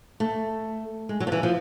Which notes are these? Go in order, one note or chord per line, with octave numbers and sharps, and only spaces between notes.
A3
G#3
F#3
F3
E3
F3